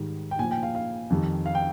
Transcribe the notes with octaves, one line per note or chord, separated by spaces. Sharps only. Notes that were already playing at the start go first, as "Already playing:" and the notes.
Already playing: G#2 D#3 G3
G5
A#2 F3 G#5
G5
F5
F5
F2 D#3 G3
F5
G5